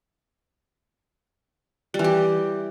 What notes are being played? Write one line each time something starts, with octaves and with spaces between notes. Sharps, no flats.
G3
E3
G4